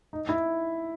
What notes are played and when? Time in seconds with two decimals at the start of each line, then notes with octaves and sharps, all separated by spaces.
0.13 D#4
0.29 E4